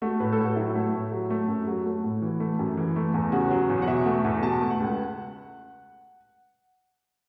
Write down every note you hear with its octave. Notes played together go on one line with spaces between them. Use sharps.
A3 F#4
A2 B4
A4
A2
F#4
F#3 E4
A3
A2
F#3
A3
F#2
F#3 F#4
A3
A2
E3
A3
F#2
E3
A3
E2
C#3 F#4
F#3
E2
F#5
B2 E5
A3
E2
B2 A5
A3
F#5
C#2